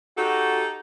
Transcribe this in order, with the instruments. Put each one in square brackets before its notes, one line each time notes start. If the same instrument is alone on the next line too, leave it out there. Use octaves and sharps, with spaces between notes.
[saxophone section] D#4 G4 A4 [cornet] F#4